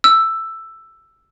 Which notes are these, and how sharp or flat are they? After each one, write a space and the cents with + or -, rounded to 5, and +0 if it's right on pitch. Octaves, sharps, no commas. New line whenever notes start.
E6 +5